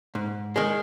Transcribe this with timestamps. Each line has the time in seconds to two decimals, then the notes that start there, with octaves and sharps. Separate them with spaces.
0.15 G#2
0.56 D#3 G#3